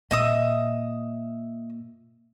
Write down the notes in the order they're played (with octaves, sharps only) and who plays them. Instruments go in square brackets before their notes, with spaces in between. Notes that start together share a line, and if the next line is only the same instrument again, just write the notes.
[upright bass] A#2 [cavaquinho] D#5 E5 D#6